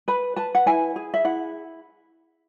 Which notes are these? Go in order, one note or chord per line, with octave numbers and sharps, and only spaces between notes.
B4 B5
B4 A5
F#5
E4 G#5
G#4
E5
E4 F#5